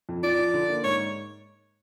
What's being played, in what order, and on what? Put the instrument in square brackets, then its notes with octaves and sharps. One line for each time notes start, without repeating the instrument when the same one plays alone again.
[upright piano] F2
[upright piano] F3 [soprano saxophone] D5
[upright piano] F3
D3
A#3
[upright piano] G#2 [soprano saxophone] C#5